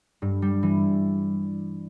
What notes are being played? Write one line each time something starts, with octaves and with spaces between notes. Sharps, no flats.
G2
G3
E3